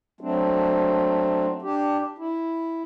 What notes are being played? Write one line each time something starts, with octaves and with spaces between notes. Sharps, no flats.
F#3 A3 C4 D4
D4 G4
E4